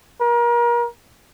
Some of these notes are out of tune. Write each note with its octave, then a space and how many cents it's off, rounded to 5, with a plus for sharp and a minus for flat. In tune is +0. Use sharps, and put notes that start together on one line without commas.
A#4 +35